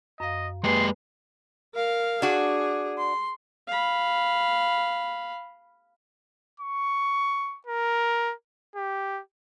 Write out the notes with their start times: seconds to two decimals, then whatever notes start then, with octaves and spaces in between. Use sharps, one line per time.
0.20 F#2 D#5 F5
0.64 G#3 A#3 G4 B4 G#5 C6
1.74 A#4 F5
2.22 D4 F#4 G#4
2.98 C6
3.68 F5 B5
6.60 C#6
7.67 A#4
8.76 G4